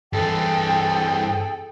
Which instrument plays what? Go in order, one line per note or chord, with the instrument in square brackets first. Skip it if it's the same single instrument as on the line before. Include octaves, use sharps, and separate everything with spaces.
[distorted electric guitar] G2 E3 [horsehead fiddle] G#4 A4 [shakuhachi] G5